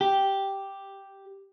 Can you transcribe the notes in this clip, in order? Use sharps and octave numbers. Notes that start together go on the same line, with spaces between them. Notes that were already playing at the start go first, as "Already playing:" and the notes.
G4